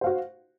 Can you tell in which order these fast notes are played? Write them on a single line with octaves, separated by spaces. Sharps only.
C5 F5 F#4